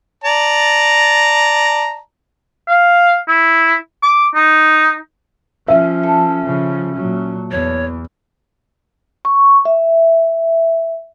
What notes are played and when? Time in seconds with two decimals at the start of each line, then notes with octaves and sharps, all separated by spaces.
0.24 D5 A5 A#5
2.68 F5
3.28 E4
4.03 D6
4.35 D#4
5.68 F3 C#4 E5
6.03 A4
6.45 C#3 F3
6.96 A#2 F#3
7.51 E2 C#5
9.25 C#6
9.65 E5